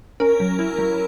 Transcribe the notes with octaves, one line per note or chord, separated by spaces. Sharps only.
C#4 A#4
F#3
E4
F#3